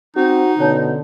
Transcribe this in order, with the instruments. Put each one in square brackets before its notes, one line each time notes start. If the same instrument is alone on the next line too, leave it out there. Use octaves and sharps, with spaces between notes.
[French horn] C4 [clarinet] D#4 [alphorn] F#4
[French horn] B2 [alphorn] D3 [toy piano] C#4 C#5 A5